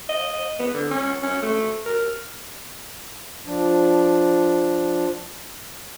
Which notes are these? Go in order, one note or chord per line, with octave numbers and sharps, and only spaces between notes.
D#5
B3
D3
C#4
C#4
A3
A#4
F3 D4